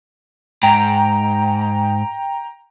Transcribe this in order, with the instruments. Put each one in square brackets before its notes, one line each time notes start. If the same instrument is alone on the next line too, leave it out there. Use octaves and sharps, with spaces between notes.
[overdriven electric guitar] G#2 [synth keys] G5 A#5